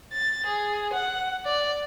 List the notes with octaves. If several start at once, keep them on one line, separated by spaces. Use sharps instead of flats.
A6
G#4
F#5
D5